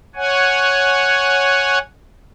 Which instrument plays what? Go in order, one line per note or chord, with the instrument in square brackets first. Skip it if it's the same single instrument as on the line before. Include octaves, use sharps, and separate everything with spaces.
[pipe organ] C#5 F#5 G#5